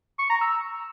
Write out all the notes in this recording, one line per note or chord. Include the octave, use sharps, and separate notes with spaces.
C#6
A#5
E6